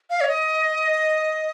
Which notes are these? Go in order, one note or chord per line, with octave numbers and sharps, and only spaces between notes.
F5
C#5
D#5